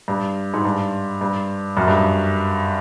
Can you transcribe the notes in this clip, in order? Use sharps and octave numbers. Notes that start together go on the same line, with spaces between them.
G2
G#2
G2
G2
F#2
G2
F#2